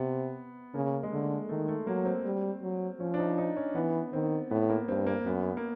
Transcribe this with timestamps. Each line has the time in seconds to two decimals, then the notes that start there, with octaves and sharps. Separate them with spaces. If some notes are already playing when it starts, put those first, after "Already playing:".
Already playing: C3 B3
0.74 C#3 A#3
1.03 G#3
1.12 D3 A3
1.49 D#3 A3
1.68 A3
1.87 F#3 A#3
2.05 C4
2.25 G3
2.62 F#3
3.00 F3 C#4
3.14 D4
3.19 D#4
3.38 D#4
3.56 C#4
3.75 E3 B3
4.13 D#3 C4
4.51 A2 B3
4.69 A#3
4.88 G2 C4
5.07 A#3
5.25 F#2 B3
5.57 A#3